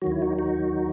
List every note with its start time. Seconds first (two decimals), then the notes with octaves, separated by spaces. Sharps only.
0.02 D#2 D#3 F#3 F#4
0.12 E4
0.22 D#4 F#4
0.39 D#4 F#4